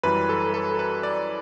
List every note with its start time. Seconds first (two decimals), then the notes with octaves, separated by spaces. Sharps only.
0.03 F#2 E3 G3 B4
0.29 A4
0.54 A4
0.79 B4
1.03 D5